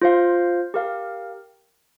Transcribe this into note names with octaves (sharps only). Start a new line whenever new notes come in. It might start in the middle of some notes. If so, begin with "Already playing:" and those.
F4 C5 F5
G4 A#4 F5